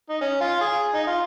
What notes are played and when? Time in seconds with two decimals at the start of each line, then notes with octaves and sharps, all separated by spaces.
0.09 D#4
0.21 C#4
0.41 F4
0.61 G#4
0.94 D#4
1.07 F4